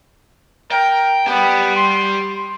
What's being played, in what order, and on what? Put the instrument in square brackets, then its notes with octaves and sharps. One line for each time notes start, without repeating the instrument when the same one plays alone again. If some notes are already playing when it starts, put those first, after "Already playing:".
[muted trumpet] A#4 [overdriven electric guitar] G5
[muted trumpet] B3 [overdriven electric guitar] G4 D5
[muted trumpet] C6